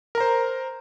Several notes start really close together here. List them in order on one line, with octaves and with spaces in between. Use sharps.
A#4 A#5 C5